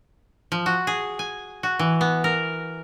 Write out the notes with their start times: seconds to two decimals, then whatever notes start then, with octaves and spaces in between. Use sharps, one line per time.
0.52 F3
0.66 F#4
0.87 G#4
1.19 G#5
1.63 F#4
1.79 E3
2.01 B3
2.24 A#4